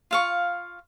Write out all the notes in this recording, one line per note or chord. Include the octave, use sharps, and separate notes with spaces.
F4 F5 C#6